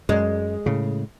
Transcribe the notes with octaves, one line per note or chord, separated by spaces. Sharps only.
F#2 G#3
A2 C#3